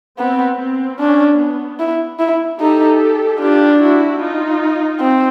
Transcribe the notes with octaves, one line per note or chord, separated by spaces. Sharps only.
B3 C4
C4
C#4 D4
B3
E4
E4
D#4 G4 A4
D4 F4 G4
E4 F#4
D#4 F4
C4